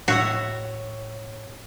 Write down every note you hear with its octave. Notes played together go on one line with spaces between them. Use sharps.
A2 F#4 C#5 E5 F#5